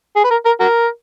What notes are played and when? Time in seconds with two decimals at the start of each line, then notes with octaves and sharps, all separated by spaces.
0.16 G#4
0.24 B4
0.31 A#4
0.46 A#4
0.60 F#4 A#4